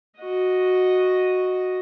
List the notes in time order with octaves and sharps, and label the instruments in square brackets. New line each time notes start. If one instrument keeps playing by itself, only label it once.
[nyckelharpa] F#4 D#5